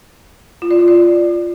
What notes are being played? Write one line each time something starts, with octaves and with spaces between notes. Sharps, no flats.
F4
D5
F4
D5